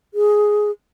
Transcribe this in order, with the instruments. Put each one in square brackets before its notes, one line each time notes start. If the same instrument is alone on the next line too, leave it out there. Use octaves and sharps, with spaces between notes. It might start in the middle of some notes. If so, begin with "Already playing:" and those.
[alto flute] G#4